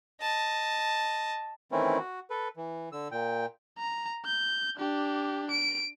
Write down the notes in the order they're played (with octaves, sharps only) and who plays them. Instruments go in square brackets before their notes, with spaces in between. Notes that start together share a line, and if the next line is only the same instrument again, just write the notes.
[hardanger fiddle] D#5 A5
[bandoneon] D#3 E3 A3 C4 C#4 E4
F#4
A4 B4
E3
D3 E6
A#2 G5
[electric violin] A#5
G6
D4 G4
D7